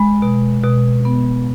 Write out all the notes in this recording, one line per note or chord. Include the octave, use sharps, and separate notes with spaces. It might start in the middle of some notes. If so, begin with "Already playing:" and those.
Already playing: G#3 B5
B2
B2
B3